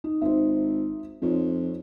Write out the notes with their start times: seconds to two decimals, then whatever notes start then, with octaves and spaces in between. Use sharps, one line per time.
0.04 D#4
0.21 G#1 D#4 C5 E5
1.22 F2 D#4 F4 C#5